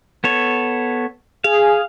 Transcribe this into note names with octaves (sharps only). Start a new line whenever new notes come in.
B3 A4 C#5
G#4 F5